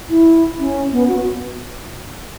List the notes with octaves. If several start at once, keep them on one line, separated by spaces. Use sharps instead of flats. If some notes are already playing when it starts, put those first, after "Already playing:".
E4
C#4
B3
F#4